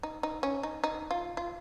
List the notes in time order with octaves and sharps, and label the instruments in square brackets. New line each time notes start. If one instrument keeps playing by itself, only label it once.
[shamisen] D#4
D#4
C#4
D#4
D#4
F4
F4